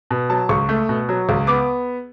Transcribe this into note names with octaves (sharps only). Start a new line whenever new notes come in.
B2
F#3 A5
C#2 C#6
A3
B2
F#3
C#2
B3 D6